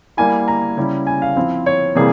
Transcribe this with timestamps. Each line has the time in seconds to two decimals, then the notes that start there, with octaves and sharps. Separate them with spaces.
0.17 G3 A#3 E4 G#5
0.48 A#5
0.77 C#3 G3 C#4 E4
1.07 G#5
1.22 F5
1.36 F3 C4 E4
1.66 C#5
1.95 C3 E3 G3 A#3 G#4